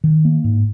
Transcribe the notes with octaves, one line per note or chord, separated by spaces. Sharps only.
D#3
A#3
G#2